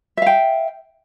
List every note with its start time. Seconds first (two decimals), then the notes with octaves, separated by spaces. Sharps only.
0.17 E5
0.22 F5
0.27 G5